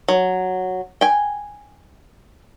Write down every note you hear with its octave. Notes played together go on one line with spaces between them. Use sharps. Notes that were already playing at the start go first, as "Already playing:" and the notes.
F#3
G5 G#5